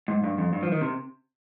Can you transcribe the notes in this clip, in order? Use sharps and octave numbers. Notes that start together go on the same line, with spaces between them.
G#2
G2
F2
G2
F3
D#3
C3